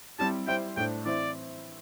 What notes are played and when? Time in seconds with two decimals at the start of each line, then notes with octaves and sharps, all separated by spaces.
0.19 G3 C4 E4 G4 A5
0.47 G3 E4 C5 E5 G5
0.77 A2 A3 D4 C5 G5
1.05 E3 C4 E4 C5 D5 E5